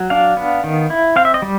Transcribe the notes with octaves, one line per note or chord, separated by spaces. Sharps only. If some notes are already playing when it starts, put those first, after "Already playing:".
Already playing: F#3
D4 F5
B3
D#3
E4
C4 F5
E5
D#5
G3